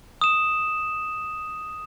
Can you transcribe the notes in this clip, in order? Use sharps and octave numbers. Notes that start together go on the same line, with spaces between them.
D#6 E7